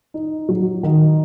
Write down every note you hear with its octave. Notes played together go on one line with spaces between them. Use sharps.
D#4
F#3
D#3